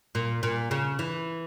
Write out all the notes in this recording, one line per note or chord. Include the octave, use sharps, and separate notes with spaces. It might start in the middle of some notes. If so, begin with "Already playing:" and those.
A#2
A#2
C#3
E3